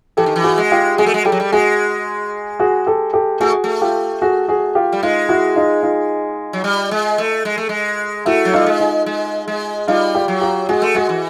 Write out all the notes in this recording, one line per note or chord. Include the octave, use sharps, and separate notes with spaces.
E3 G4 A4
D#3
E3
F#4 G#4
G#3
F4 G4
G#3 F#4 G#4
A3
G#3
G3 G4 A4
F#3
G3
G#3 F#4 G#4
F#4 G#4
G4 A4
G4 A4
A3 F#4 G#4
A3
F4 G4
F#4 G#4
F#4 G#4
F4 G4
G3
G#3 D#4 F4
E4 F#4
D#4 F4
D#4 F4
F#3
G3
G#3
A3
G#3
A3
G#3
A3 E4 F#4
F#3
G3 D#4 F4
G#3
D#4 F4
G#3
G#3
G3 D#4 F4
F4 G4
F#3
F4 G4
G#3 F#4 G#4
A3
G#3 F#4 G#4
E3